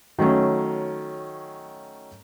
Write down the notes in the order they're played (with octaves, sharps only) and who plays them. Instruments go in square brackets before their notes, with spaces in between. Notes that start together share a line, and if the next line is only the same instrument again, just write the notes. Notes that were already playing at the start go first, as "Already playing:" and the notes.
[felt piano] D#3 F#3 A3 C#4